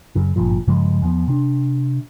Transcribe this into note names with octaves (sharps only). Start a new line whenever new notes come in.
F#2 C#3
G#1 G2 A#2 F3
G2 C#3 F3 G#3
E2 F3 B3
C3 D4